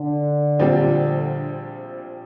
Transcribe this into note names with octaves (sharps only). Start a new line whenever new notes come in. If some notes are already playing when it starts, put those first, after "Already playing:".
Already playing: D3
A#1 A#2 G3 C4